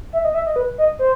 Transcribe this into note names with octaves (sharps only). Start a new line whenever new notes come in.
E5
D#5
E5
D#5
B4
D#5
C5